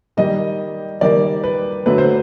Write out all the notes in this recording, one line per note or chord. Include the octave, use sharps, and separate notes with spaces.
D#3 G3 A#3 D#5
D#3 G3 A#3 D5
B4
D3 F#3 A3 B4
C5